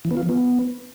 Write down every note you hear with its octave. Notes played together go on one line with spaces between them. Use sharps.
E3
B3
F4
F3
B3